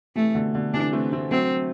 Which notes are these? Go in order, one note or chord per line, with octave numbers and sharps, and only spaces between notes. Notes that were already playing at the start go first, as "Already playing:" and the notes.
C3 E3 A3
B2 D3
B2 D3
C3 E3 D4
A3 C4
A3 C4
F#3 A3 C4